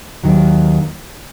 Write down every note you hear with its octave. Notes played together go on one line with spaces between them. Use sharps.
D#2 D#3 F#3